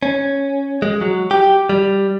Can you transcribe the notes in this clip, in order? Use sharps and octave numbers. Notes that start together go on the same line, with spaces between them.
C#4
G#3
F#3
G4
G3